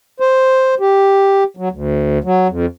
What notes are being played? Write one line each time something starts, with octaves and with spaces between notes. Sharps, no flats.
C5
G4
F#3
D2
F#3
F2